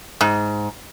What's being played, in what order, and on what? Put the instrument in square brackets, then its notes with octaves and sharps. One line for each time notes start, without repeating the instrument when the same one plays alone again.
[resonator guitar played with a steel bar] G#2